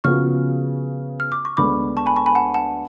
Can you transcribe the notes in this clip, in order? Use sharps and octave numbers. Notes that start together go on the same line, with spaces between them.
C#3 F3 B3 F#4 C#6 F6
F6
D6
C#6
D2 D3 G#3 B3 D4 B5 D6
A5 C#6
G#5 B5
A5 C#6
G#5 B5
F#5 A5
F#5 A5